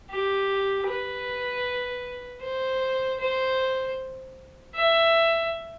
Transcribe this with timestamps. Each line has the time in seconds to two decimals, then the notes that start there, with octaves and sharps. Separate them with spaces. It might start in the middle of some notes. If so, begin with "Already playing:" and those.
0.10 G4
0.87 B4
2.42 C5
3.20 C5
4.75 E5